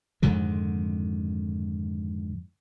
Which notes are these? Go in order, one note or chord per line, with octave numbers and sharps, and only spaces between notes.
F2 G#2 D3 D#3